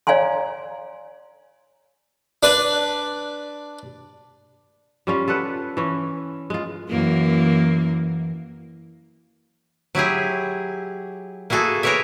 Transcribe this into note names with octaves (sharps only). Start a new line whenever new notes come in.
C#5 D5 F5 G#5 A#5 C6
D4 B4
G3 C#4 F4
F4 A4 B4 F#5
E3 C#4
G#3 F4
F#2 E3 A#3
F#3 E4 G4 G#4
A#3 E4 F#4 G#4 A4
G#4 A#4 B4 C#5 D5 E5